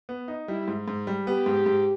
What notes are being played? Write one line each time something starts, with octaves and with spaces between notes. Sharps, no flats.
B3
D#4
G3 E4
G#2
G#2
G3
B3 G4
G#2
G#2